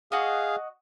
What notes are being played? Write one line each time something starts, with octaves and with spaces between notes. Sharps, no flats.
F#4 G#4 D#5 F5